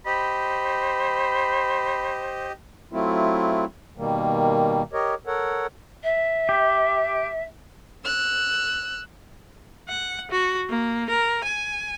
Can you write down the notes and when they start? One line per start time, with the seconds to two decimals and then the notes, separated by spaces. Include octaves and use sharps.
0.06 G4 C5 D#5 B5
2.92 F#3 A3 C4 E4 F4
3.98 B2 D#3 G3 A#3
4.93 G4 A#4 C#5 D#5
5.27 A4 A#4 C#5 F#5
6.03 E5
6.49 G4
8.05 E6 F#6
9.89 F#5
10.31 F#4
10.69 A#3
11.09 A#4
11.44 G#5